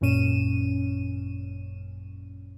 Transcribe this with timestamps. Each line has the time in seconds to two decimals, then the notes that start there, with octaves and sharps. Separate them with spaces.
0.01 G#1 F#2 A#2 C#4 D#7 E7